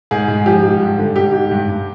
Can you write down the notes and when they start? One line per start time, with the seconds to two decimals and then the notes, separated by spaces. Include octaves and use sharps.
0.11 G#2 G#4
0.28 G#2
0.46 F3 G4
0.63 G#2
0.81 G2
0.98 D3
1.16 G#2 G4
1.33 G#2
1.51 G2
1.68 G2